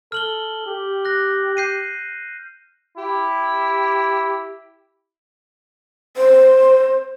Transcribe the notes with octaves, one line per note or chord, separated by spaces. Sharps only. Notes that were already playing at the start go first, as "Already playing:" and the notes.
A4 F6 F#7 G7
G4
F#6 A#6
G6 C7 D#7
E4 G4
C5